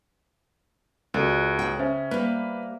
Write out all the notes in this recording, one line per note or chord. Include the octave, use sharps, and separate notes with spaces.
C#2 F#4 A4 D5 F#6
C#3 G5
C#4 C5 E5
G3 A#3 B4